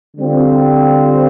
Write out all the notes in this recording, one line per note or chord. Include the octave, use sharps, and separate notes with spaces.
D3 G3 C4 F4